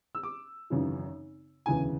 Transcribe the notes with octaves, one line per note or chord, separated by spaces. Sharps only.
E6
D6
G#1 F#2 C#3 E3
E1 D2 C#3 E3 G#5